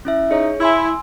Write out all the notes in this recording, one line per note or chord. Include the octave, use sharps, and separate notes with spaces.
C#4 E4 E5
D#4 G#4 C#5
E4 G#5 C6 E6